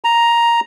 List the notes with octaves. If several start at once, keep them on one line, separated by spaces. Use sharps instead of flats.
A#5